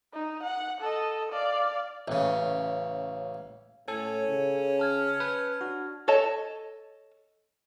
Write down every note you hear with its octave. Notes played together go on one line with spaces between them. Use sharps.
D#4
F#5
A4 D#5
D5 F5
A1 C#3
A2 C#4 A4
C#3
A5 F6 G#6
B4
D4 F#4
A4 C#5 D#5 A5